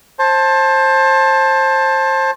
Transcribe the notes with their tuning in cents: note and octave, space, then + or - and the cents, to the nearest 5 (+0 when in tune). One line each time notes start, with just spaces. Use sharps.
C5 +25 A5 +0